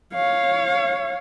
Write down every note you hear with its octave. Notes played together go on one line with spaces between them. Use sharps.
C#5 F5